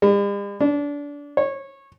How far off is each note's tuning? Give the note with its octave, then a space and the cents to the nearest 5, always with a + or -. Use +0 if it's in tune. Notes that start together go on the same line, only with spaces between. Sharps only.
G3 +45
D4 -25
C#5 -20